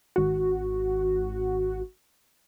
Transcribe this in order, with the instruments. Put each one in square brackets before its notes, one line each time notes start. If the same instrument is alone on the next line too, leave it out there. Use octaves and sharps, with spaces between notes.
[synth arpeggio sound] G#1 F#4